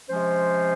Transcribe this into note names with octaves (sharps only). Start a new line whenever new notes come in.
C3 F3 G#3 C#4 C5